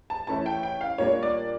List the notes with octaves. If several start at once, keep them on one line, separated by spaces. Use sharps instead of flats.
A5
E3 A3 C#4 E4 A5
G5
G5
F5
A#2 G3 A#3 D4 C#5
D5